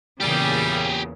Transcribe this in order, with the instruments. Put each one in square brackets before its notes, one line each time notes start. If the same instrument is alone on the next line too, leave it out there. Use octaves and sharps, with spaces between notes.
[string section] E2 A#2 C#3 [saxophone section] G3 [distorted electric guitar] G4 G#4